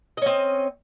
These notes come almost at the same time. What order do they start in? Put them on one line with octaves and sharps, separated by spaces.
D#5 C#4 C4